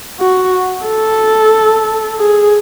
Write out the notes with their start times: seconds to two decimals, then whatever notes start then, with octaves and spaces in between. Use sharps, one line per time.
0.20 F#4
0.87 A4
2.18 G#4